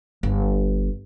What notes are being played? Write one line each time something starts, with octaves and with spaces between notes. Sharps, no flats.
G1